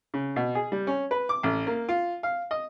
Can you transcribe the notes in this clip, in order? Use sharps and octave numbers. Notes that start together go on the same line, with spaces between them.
C#3
B2
G#4
G3
C#4
B4
D6
A1
A#3
F4
F5
D#5